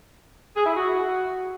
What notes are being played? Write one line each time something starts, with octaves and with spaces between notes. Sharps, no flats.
G#4
E4
F#4